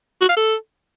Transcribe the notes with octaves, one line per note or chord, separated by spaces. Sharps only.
F#4
F5
A4